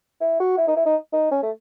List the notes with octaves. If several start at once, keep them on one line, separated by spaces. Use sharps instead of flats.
E4
F#4
E4
D#4
E4
D#4
D#4
C#4
A3